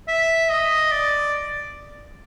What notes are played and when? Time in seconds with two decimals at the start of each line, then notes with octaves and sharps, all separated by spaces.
0.08 E5
0.50 D#5
0.91 D5